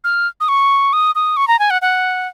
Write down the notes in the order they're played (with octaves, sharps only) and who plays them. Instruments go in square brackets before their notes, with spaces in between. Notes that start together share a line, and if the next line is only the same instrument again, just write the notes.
[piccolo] F6
D#6
C#6
D#6
D#6
C#6
A#5
G#5
F#5
F#5